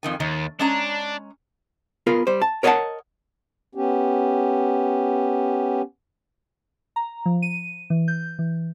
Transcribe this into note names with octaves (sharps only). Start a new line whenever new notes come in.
F2 D#3 G#5
D#2 D#3
G#3 C#4 D4 A#5
B3 F4 G#4 A#4
G3 C5
A5
A#4 C#5 D#5 F5 F#5 A5
B3 C#4 G4
A#5
F3
D#7
E3
G6
E3